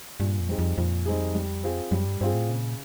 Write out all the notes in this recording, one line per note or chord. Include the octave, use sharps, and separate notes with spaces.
G2 A#2
F2
G3 C4 D#4 G#4
F2
F2 A#2
G3 C4 D#4 G#4
G3
C4 F4 G#4
F#2 G3
G2
G2 C4 F4 G#4
A2
A#2 C#3